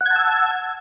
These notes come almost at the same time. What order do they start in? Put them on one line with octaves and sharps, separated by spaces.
F#5 G#6 A5 E6